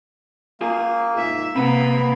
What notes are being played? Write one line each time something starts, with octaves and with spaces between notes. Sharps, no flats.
A#3 F4 G#4 G#5
G#2 E5
C3 A#3 C4 B4 F#5 B5